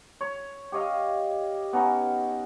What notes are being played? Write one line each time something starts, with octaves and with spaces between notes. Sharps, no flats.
C#5
G4 C#5 D#5 F5
B3 C#4 D#4 D#5